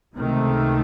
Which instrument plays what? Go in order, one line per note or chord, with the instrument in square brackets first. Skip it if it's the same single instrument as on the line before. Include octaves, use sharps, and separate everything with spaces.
[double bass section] C#2 C3 D#3 A3